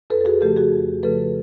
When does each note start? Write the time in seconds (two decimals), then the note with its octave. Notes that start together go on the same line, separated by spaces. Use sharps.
0.10 F2 A4 B4
0.21 A4
0.25 F#4 G#4
0.41 C#3 F3 A3 G4 A4
0.57 F#4 G#4
0.72 F2
1.03 C#3 F3 A3 A4 B4